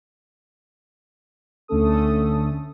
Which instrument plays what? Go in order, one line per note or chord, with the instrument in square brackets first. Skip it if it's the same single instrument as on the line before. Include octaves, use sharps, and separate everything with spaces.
[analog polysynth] D2 D3 A3 C#4 A4 D#6